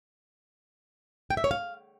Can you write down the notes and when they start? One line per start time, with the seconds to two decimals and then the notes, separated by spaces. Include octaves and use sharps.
1.30 G5
1.37 E5
1.44 C#5
1.51 F5